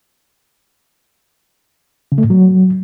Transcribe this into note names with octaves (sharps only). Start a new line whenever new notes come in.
C#3
A3
A2
F#3